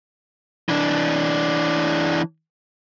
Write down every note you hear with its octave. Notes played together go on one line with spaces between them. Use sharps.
E3 D4